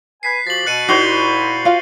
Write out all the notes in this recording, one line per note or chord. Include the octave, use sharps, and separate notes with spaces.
B4 G#5 F#6 B6 C7
F3 F#4 G4 A6 F#7
B2 F#6 C#7 D#7
A#2 D#4 E4 F#4 C5 C7 F7 G7
F4 F5